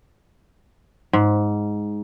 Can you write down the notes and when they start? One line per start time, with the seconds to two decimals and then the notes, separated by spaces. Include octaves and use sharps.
1.13 G#2